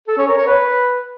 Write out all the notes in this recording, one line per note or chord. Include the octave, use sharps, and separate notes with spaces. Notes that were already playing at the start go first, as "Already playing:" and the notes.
A4
C#4
A#4
C#5
B4